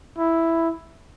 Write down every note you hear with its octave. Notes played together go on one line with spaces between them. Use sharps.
E4